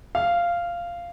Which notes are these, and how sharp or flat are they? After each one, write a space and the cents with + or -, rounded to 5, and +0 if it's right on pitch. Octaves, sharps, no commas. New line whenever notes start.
F5 -10